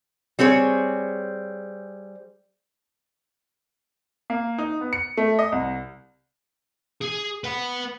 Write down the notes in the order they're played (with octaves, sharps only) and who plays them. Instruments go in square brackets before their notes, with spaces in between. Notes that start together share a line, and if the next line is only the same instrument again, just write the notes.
[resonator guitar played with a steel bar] G3 C4 G#4 C#5
[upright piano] A#3
D#4
B3
C#7
A3
D#5
C2
[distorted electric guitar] G#4
B4 F#5